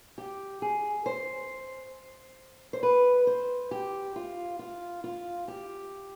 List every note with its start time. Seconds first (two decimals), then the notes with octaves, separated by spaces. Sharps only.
0.18 G4
0.62 G#4
1.06 C5
2.73 C5
2.83 B4
3.27 C5
3.71 G4
4.16 F4
4.59 F4
5.04 F4
5.48 G4